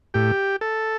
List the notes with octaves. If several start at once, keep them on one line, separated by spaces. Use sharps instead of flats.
A2 G4
A4